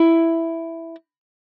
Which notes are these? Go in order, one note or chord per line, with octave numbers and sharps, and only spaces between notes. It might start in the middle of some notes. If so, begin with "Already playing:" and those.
Already playing: E4